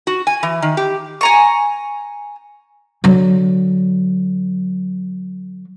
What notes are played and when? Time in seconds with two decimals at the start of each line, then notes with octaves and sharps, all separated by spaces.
0.07 F#4
0.27 G#5
0.43 E3
0.62 D#3
0.77 G4
1.21 G#5 A#5 C#6
3.04 D3 F#3